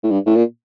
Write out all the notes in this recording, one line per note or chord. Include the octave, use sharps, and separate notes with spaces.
A2
G2
A2
A#2